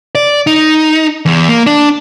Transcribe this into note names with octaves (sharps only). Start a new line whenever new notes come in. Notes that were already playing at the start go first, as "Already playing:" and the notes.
D5
D#4
E2
A#3
D4